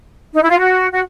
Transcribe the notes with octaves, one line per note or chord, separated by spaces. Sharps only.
D#4
E4
F4
F#4
F#4